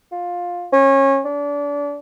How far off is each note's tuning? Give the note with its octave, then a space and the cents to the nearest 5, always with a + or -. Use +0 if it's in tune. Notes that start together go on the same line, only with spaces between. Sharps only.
F4 +15
C#4 -25
D4 -30